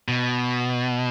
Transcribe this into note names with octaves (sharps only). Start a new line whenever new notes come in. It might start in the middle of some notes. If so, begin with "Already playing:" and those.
B2